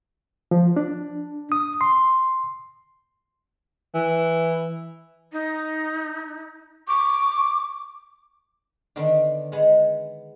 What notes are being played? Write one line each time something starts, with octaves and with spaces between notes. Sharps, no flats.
F3
D4
D#6
C6
E3
D#4
C#6 D6
D3 D#3 B3 D4
G#3 B3